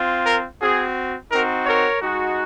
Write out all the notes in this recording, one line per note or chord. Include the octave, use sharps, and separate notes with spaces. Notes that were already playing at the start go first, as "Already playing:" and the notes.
Already playing: C4 F4
A#4
C4 F#4 G#4
C4 D#4 F#4 A#4
A#4 C#5
G#3 D#4 F#4